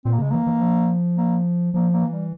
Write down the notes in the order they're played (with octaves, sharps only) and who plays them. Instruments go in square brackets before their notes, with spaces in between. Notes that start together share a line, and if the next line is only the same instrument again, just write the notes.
[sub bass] A#2 [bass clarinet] C4
[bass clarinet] A#3
[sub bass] C#3 [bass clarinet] G#3
[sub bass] E3 [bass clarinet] A#3
[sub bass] E3
F3
[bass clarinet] A#3
[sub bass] F3 [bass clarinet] A#3
[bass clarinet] A#3
[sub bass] E3
[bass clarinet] G3